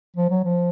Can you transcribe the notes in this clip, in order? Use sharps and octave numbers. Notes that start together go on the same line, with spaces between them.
F3
F#3
F3